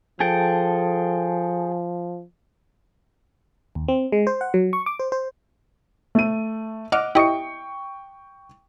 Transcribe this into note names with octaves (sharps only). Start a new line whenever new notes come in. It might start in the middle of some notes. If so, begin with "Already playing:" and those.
F3 G#4 A4 G5
D#2
C4
G#3
C5
F#5
F#3
C#6
D6
C5
C5
A3 D#7
D#5 F#5 D6 F6
E4 G4 D#5 G5 C#6 C#7